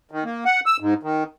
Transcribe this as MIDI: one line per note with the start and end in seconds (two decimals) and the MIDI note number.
0.11 0.24 51
0.25 0.44 58
0.45 0.60 78
0.66 0.77 88
0.80 0.94 44
1.03 1.23 51